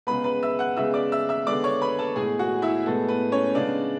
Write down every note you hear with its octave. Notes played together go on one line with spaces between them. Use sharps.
C#3 G#3 B3 B4 B5
B4 B5
E5 E6
F#5 F#6
C#3 G#3 B3 E5 E6
D5 D6
E5 E6
E5 E6
D3 G#3 B3 D5 D6
C#5 C#6
B4 B5
A4 A5
A2 G#3 B3 G#4 G#5
F#4 F#5
E4 E5
A2 G#3 B3 A4
B3 B4
C#4 C#5
C#3 G#3 B3 D4 D5